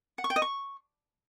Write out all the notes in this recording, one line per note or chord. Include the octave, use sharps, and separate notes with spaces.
F#5
C#6
G5
D#5
C#6